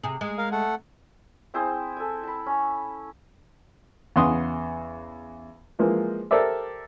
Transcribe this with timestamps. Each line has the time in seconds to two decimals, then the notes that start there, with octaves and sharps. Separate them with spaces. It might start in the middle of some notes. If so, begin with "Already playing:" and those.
0.03 C3 G#4
0.21 G#3
0.38 A#4 F5
0.52 A3 A4 F#5
1.54 C4 E4 G#4 C5
1.97 A4 G#5
2.23 A5 B5
2.46 C#4
4.16 E2 C#3 F#5 C6 D#6
5.79 E3 F3 G#3 A#3
6.31 G4 A4 A#4 C5 D5 E5